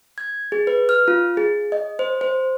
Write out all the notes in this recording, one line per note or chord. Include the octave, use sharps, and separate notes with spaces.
G#6
G#4
B4
F6
F4
G#4
D#5
C5
C5